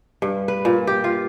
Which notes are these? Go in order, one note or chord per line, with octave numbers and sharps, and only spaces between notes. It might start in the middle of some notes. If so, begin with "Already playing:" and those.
G2
B4
A#2
G4
F4